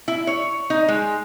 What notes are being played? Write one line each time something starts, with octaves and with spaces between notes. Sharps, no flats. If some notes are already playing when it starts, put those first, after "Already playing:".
E4
C#5
D#4
G#3